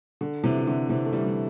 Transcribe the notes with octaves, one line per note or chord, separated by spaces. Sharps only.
D3
C3 E3
E3
D3
C3 E3
A3
E3 G3
E3